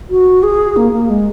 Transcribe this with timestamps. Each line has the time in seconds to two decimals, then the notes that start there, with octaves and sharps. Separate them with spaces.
0.10 F#4
0.43 G#4
0.77 A#3
0.92 A#3
1.10 G#3